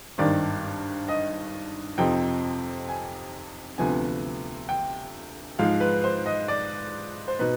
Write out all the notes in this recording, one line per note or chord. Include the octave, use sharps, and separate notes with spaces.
G#1 G2 D#3 D5
D#5
F2 C3 F3 C4 D#4 G5
G#5
D2 C3 F3 B3 G#5
G5
G#2 F3 G#3 F5
B4
C5
D#5
D5
C5
B2 B3 D#4 B4